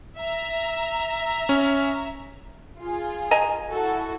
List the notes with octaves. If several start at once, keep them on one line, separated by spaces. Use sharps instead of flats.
E5 A#5
C#4
F4 G#4
D#5 G#5 A#5
E4 F#4 A4